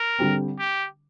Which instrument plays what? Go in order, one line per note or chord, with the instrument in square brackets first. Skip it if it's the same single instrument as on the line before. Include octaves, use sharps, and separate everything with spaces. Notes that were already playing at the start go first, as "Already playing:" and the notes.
Already playing: [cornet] A#4
[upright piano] D3 G3 C4
[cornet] G4